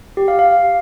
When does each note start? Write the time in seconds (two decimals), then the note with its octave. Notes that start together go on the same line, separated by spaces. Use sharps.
0.17 G4
0.28 F5
0.39 F5